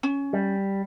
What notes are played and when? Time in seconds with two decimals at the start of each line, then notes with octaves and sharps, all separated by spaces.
0.03 C#4
0.33 G3